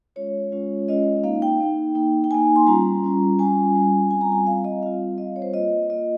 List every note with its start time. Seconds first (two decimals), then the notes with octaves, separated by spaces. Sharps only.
0.16 G#3 C#4 F4 C#5
0.52 G#3 C#4 F4
0.88 G#3 C#4 F4 D#5
1.24 A#3 D#4 F5
1.42 G5
1.60 A#3 D#4
1.95 A#3 D#4
2.24 G5
2.31 A#3 D#4 G#5
2.56 C6
2.67 G3 C#4 F4 A#5
3.03 G3 C#4 F4
3.39 G3 C#4 F4 G#5
3.75 G3 C#4 F4
4.10 G3 C4 F4 G#5
4.21 A#5
4.32 G#5
4.47 G3 C4 F4 F5
4.65 D#5
4.82 G3 C4 F4 F5
5.18 G3 C4 F4 D#5
5.36 C#5
5.42 C5
5.54 A#3 F4 D#5
5.90 A#3 F4 D#5